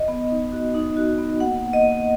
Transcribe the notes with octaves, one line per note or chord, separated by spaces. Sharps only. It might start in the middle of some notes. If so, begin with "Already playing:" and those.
Already playing: D#5
B3
D#4
F#4
D#4
F#4
B3
A#3 F#5
A#3
D#5
A#3